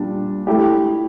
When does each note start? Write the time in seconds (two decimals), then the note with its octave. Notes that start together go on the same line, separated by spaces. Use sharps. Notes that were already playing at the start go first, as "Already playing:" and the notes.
Already playing: A#2 G3 D4
0.47 A3 E4 G4